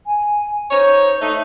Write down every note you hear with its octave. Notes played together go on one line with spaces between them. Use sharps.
G#5
D#4 C5 C#5
A3 D#4